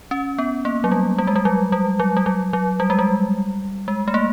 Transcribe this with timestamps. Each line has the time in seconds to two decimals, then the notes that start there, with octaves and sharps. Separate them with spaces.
0.11 C#4
0.38 B3
0.65 A#3
0.84 F#3
0.92 G3
1.18 G3
1.27 G#3
1.36 G3
1.45 F#3
1.72 G3
2.00 F#3
2.17 G3
2.26 F#3
2.53 F#3
2.80 G3
2.90 G#3
2.99 G3
3.88 G#3
4.08 A3
4.14 A#3